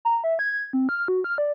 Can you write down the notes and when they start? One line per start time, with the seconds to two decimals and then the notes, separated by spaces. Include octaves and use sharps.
0.05 A#5
0.24 E5
0.39 G#6
0.73 C4
0.89 F6
1.08 F#4
1.24 F6
1.38 D5